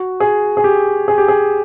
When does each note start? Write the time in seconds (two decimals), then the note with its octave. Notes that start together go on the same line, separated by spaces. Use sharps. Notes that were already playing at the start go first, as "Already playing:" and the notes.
Already playing: F#4
0.20 G#4
0.57 G#4
0.64 G4
1.08 G#4
1.18 G4
1.28 G#4